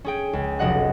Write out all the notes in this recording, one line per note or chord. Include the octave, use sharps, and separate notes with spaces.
C#4 G#4 G5
C#2
F1 B1 D#5 F#5 F#6